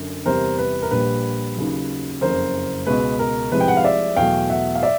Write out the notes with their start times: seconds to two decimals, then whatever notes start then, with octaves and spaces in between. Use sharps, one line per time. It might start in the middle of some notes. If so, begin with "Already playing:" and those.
Already playing: F#2 D3
0.26 E2 C3 E3 G3 A#4 C5
0.58 B4
0.83 A#4
0.91 A#1 A#2 G3 B4
1.56 D#2 C#3 F#3
2.21 F#1 F2 C#3 A#4 C5
2.87 C#2 B2 G#3 B4
3.19 A#4
3.52 C2 C3 F3 G#3 B4
3.60 G5
3.68 F#5
3.77 F5
3.84 D5 E5
4.16 E2 B2 F#3 A3 F5 G5
4.49 E5 F#5
4.75 F5
4.83 D5 E5